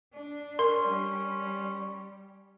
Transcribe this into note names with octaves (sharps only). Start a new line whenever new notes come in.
D4
C#4 A#4 C6
G3